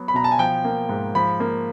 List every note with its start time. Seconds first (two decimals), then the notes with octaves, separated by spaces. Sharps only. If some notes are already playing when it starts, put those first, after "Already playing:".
Already playing: F#3 B3
0.08 B5
0.14 B2 A#5
0.24 A5
0.31 G#5
0.39 F3 G5
0.65 A#3
0.89 G#2
1.15 F3 B5
1.40 A#3